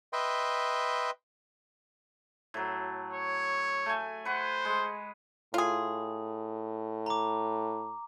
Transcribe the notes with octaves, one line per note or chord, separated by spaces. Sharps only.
B4 D#5 E5 G5 C6
A2 F#3
C#5
A3 G#5
B4 C5 F#5 C#6
G#3
A2 F4 G#4
A#5 D6